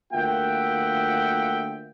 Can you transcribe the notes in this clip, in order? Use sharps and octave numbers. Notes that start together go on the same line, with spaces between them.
D2 A#3 F4 E5 F#5 G5